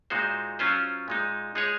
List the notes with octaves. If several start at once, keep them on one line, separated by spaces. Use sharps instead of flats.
A#2 G#3 D#4 F#4 C5
F#3 C#4 F4 C5
A#2 G#3 D#4
G#3 D#4 G#4 C#5